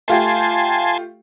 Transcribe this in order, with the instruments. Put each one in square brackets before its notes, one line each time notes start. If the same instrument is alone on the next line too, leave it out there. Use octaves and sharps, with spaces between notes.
[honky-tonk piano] A3 F4 G4 [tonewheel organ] G#5 A5 C6